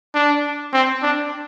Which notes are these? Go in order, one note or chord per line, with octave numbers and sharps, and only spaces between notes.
D4
C4
D4